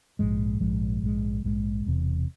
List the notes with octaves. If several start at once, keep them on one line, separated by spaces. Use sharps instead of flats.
A#1 G#2 F3 G#3
A#1 G#2 F3 G#3
A#1 G#2 F3 G#3
A#1 G#2 F3 G#3
E1 E2 C3